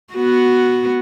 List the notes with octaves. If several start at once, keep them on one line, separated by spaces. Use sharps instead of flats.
B3 F#4